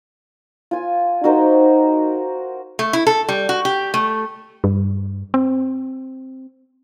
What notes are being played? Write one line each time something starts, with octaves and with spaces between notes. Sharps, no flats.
F4 G#5
D#4 F#4 A#4 C5
A3
E4
A4
G3
F#4
G4
A3
G2
C4